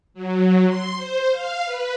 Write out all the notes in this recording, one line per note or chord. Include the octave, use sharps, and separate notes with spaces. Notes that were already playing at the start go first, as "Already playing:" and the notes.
F#3
C6
C5
F5
B4